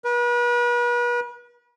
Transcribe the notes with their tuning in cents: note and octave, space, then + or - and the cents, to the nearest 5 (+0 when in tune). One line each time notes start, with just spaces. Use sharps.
B4 -40